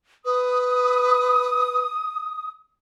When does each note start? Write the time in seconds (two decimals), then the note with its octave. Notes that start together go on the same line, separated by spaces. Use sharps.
0.25 B4 D#6